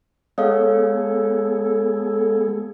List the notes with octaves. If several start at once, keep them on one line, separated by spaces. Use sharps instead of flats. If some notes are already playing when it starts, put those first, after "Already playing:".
G#3 B3 G#4 A4 C#5 F5